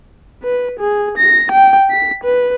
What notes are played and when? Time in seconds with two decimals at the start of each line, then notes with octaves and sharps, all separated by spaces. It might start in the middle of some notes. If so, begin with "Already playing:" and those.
0.43 B4
0.79 G#4
1.18 A#6
1.52 G5
1.91 B6
2.23 B4